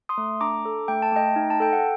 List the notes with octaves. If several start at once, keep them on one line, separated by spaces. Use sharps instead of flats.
C6 D#6
A3
D4 A#5 D6
A4
A3 G5
A5
A3 D#5 G5
D#4
A5
A4 G5
F#5